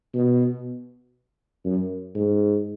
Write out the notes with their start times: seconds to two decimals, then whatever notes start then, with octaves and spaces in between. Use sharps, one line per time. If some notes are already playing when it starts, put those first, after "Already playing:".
0.14 B2
1.65 F#2
2.15 G#2